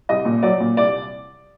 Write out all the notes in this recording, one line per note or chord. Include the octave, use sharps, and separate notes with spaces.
C2 D#5
A#2
F#3 D5
A#2
C2 D5